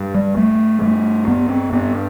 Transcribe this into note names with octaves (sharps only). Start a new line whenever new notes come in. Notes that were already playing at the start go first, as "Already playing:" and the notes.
Already playing: G2
G3
G2 A3
G2 A3
G2 B3
C4
G2 B3